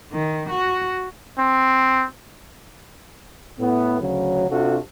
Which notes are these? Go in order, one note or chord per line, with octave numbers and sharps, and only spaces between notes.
D#3
F#4
C4
A2 B3
D2 C#3 F#3
C3 D4 F4 F#4 A4